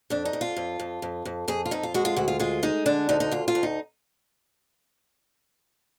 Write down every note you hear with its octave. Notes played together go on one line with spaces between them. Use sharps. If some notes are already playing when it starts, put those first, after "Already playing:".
F2 D4
D#4
F2
F4
F2
F2
F2
F2
F2 G#4
F4
F2 D#4
F4
G#3 F#4
F4
D2 F#4
F4
G#3 F4
G#3 D#4
D3 D4
D2 D#4
D#4
D2 F4
F4
D2
D#4